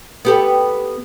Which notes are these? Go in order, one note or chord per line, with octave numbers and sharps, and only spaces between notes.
B3 G4 A4